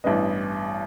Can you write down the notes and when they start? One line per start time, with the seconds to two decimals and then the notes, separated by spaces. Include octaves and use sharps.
0.04 A1 G2 E3 B3 D#5